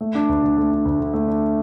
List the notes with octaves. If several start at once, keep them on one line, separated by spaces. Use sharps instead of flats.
A3
D4
D2
D3
A3
D4
D2
D3
A3
D4